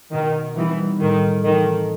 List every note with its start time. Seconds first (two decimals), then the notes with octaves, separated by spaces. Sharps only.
0.13 B2 D#3
0.57 E3 G3 C4 D#4
1.01 A2 D#3
1.45 D#3 E3 A3